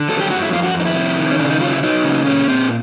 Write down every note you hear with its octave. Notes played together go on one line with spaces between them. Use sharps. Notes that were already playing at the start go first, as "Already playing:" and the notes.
Already playing: D3
F#3 A4
G4
F#2 F#4
E4
F2 F4
F#4
F2
D#4
E4
C3
D#3
C#4
C#3 D4
D#4
F#3 F4
E4
F#3 D#4
C#3
A#2 C#4
A#2 C4